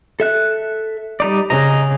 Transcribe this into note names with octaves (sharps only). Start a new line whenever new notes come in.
A4 E5 F#6
G3 D#4 D5
C#3 D#5 A#5